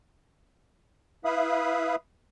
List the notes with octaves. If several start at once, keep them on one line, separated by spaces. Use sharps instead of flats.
E4 B4 E5 F5 B5 D#6